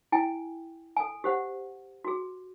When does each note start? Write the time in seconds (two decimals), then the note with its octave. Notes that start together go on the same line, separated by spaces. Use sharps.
0.12 E4 G5 G#5
0.97 A4 G#5
1.24 G4 C5 F#5
2.04 F#4 G#4